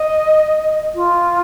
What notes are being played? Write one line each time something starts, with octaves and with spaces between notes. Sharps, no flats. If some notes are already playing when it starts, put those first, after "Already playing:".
Already playing: D#5
F4